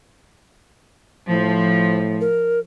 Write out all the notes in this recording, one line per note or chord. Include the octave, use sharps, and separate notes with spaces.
A2 F3
A#4